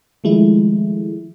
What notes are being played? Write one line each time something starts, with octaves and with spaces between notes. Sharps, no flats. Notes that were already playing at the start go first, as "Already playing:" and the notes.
D#3 F3 G#3 A3 E4